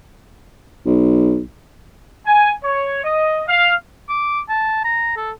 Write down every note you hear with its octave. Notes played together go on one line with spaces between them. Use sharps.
B1
G#5
C#5
D#5
F5
D6
A5
A#5
A4